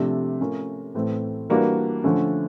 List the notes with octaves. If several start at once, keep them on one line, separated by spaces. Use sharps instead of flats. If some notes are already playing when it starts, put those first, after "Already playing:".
Already playing: C3 F3 A3 D4 G4
A3 C#4 F4 A#4
A2 E3 A3 C4
E3 G3 A#3 D4 F#4
D3 F3 A3 C#4